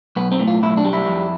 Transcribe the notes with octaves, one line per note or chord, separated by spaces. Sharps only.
B1 B3
C4
A2
F4
B1 E4
D4
G3
E4
F2